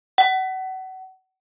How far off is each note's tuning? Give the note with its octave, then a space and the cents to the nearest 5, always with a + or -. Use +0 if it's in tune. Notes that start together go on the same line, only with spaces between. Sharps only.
F#5 +30